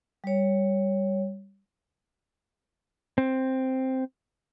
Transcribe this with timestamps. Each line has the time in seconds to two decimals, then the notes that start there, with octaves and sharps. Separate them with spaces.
0.24 G3 C#5
3.18 C4